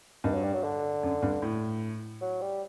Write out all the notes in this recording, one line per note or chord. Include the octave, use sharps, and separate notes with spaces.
G2 D#3
F#3
G3
F#3
D3
F#2
G2
A2
F#3
G3